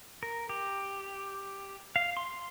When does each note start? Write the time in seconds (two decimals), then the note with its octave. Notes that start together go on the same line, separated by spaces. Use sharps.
0.23 A#4
0.49 G4
1.96 F5
2.17 C6